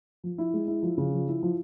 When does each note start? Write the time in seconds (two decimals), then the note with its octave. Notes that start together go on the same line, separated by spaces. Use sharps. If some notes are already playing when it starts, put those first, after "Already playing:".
0.24 F3
0.38 E4
0.54 G#3
0.68 E4
0.83 F3
0.98 C#3
1.13 F3
1.28 E4
1.43 F3